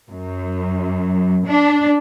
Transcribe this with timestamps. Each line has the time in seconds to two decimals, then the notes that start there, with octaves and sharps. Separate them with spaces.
0.10 F#2
1.46 D4